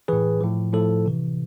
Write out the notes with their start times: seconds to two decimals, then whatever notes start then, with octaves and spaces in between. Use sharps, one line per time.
0.08 A2 E3 G#4 B4
0.41 A2 F3
0.73 A2 F3 A4
1.06 C3 E3